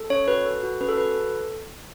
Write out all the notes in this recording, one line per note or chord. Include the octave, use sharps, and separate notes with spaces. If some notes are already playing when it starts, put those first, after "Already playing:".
Already playing: A4
C#4 C#5
F#4 B4
A4
F#4
C#4 B4
A4
F#4 B4
A4